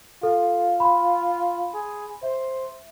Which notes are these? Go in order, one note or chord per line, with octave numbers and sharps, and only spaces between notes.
F4 A4
B5 C6
G#4
C5 E5